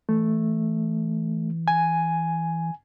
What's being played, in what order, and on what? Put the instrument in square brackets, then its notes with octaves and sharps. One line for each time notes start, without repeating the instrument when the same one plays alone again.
[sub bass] E3 [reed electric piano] A3
[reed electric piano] G#5